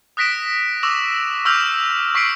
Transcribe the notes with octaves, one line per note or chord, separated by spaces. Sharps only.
D#6 F#6 A#6 B6 D7 E7
C#6 D6 E6 A#6 E7 F7
C#6 D6 E6 F6 G6 F7
C#6 B6 C7 D7 F#7